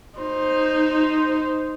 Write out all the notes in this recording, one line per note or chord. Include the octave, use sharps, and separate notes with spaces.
D#4 C5